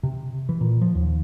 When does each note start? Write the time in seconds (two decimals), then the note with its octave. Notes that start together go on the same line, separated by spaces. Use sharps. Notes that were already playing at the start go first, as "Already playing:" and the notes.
0.03 C3
0.49 E3
0.61 A#2
0.82 F3
0.95 D#2